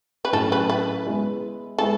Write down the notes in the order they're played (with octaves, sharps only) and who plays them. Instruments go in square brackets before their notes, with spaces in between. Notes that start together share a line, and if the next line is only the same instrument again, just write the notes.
[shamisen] B4
[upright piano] A2 F#3 C#4 [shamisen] A4
[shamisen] B4
B4
[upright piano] G#3 B3 E4
[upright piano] G#3 B3 E4 G#4 [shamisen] A4